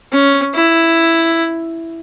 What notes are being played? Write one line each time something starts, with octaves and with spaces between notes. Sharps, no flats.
C#4
E4